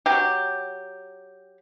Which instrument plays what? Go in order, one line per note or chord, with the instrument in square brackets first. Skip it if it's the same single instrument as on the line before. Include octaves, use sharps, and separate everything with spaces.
[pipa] F#3 G4